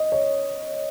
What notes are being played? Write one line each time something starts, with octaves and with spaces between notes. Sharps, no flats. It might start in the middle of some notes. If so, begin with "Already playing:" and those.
Already playing: D#5
C#5